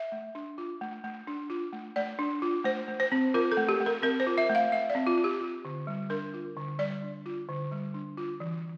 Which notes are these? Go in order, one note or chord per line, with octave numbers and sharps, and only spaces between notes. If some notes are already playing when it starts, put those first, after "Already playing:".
Already playing: E5
A3
D4
F4
A3
A3
D4
F4
A3
A3 D5
D4
F4
A3 C5
A3
C5
C4
F4 A#4
A4
A3
G4
A3
A#4
C4 A#4
C5
F4
E5
A3
F5
A3 E5
D5
C4
F4
F4
G4
F4
D3
G3
D4 A#4
F4
D3
G3 D5
D4
F4
D3
G3
D4
F4
E3